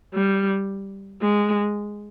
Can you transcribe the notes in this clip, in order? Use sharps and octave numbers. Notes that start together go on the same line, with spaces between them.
G3
G#3